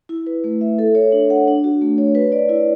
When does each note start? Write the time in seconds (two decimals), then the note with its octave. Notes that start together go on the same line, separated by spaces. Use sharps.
0.09 E4
0.27 B4
0.44 A3
0.61 E5
0.78 A4
0.95 C#5
1.12 D4
1.30 F#5
1.48 D4
1.64 F#4
1.82 A3
1.98 C#5
2.15 B4
2.32 D5
2.49 E4